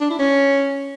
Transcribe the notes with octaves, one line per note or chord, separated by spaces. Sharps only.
D4
E4
C#4